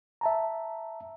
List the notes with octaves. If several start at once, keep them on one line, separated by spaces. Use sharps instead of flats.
E5 A5 A#5